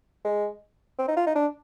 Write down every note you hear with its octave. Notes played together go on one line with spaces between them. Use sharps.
G#3
C4
D#4
F4
D#4
D4